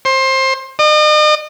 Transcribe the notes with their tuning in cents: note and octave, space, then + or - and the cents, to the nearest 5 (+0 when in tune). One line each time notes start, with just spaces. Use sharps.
C5 +20
D#5 -40